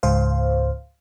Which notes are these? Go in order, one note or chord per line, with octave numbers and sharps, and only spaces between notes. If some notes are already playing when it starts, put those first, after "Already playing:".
C#2 G#2 C5 F5